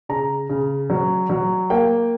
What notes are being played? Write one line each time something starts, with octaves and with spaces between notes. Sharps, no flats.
C#3 A#5
C#3
F#3
F#3
A#3 G5